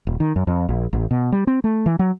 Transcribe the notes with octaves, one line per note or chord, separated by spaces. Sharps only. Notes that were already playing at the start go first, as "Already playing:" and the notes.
D#1
D#3
F#2
F2
A#1
A1
B2
G3
C4
A3
E3
F#3